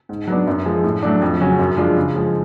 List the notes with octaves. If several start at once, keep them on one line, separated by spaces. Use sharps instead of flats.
G#2
F#3 B3 D4
F#2
F3 G#3
A2
F#3 A3 D4
F2
C#3 F#3 C#4 F#4
F#2
F3 G#3 D4 F4
C#3
F3 G#3